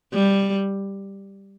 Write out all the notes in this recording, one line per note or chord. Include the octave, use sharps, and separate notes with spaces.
G3